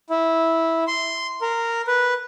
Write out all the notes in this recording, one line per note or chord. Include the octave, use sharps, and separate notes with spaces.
E4
C6
A#4
B4